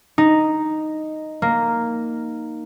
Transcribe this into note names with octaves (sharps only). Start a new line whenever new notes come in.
D#4
A#3